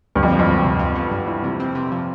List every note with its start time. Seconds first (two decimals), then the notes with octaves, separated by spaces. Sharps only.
0.15 D2 G2
0.23 F2
0.32 F3
0.39 F2
0.48 D2
0.63 C3
0.79 F4
0.95 B3
1.12 G2
1.27 E3
1.44 C3
1.60 C4
1.75 C3
1.92 F3